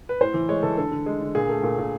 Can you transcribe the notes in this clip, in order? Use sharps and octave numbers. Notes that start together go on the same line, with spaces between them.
B4
A2 C5
E3
G#3 C#5
E3 A4
D3 A4
D3
G#3
D3
A#2 G#4
A3
A#2
A#2